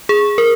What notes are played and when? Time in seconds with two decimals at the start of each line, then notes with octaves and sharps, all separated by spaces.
0.09 G#4
0.38 A#4